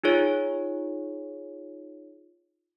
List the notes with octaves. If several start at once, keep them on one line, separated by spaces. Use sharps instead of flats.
D#4 F4 G#4 C#5